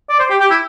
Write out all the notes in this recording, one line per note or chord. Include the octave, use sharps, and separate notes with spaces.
D5
C5
G4
G4
E4